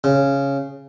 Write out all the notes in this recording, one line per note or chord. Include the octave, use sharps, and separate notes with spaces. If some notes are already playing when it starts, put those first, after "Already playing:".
C#3